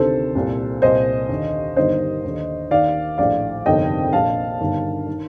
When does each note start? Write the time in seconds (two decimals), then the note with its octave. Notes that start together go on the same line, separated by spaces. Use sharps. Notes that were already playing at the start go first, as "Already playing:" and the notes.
Already playing: D2 C3 D#3 A4 C5
0.35 C2 A#2
0.82 C2 A#2 C5 D#5
1.29 D#2 D3
1.76 G1 G2 D#3 C5 D#5
2.24 D#2 D3
2.71 D#2 D#3 D5 F5
3.18 A#1 A2 D5 F5
3.66 G1 F2 C3 D#3 D#5 G5
4.13 A#1 A#2 F5 A5
4.60 G1 G2 D#3
5.08 D#3